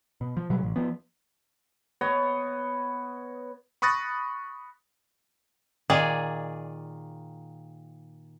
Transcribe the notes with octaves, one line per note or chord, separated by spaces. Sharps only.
B2
F3
B2 F#3 G3
A1
F3 B3
B3 C#5 D#5
B5 C#6 D#6 F#6 A6 A#6
A#2 D#3 G#4 D5